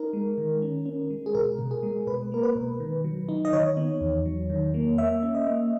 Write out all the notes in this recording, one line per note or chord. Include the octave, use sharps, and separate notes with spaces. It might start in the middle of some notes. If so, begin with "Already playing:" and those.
Already playing: D#4 A#4
G#3
D#3
C#4
C#4
G#3
G#4
B2 A#4
B2
G#4
G#3
B2 B4
A#3 A#4
B4
B2
D#3
F#3
D#4
D#5
D#3 C#5
B3
E2
F#3
D#3
A#3
A#3 E5
C#4
D#5
A#3